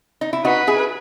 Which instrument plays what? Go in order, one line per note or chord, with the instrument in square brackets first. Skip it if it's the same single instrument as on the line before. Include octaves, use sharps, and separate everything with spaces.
[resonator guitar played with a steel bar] D#4
E4
[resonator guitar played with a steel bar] D#4 F#4 [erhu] B4
[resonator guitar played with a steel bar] E4 G#4